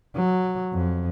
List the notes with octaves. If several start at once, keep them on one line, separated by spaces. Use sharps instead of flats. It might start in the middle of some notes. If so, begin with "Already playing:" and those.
F#3
F2